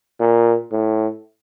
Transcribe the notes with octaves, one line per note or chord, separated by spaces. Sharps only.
A#2
A2